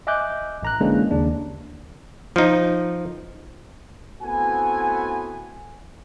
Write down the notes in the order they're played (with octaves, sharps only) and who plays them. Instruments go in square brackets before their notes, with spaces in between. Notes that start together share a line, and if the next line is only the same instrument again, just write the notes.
[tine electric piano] D#5 E5 G#5 D6 F#6 G6
A1 A#5 F#6
D3 E3 G#3 A#3 C#4 D4
D#2 C#3 D4
[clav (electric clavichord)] F3 D#4
[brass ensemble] A3 B3 C4 E4 F#4 G#5